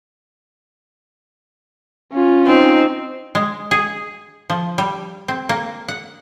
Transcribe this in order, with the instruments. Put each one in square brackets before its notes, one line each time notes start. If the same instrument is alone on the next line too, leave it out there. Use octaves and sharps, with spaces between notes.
[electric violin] C#4 F4
[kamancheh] C4 [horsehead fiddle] D#4
[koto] G#3
G#4
F3
G3
C4
A#3
F#5